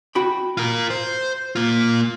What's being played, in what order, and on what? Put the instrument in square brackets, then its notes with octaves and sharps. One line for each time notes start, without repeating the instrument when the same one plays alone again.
[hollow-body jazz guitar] F#4 G5 B5
[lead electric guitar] F4 A#4
C5
A#3 F4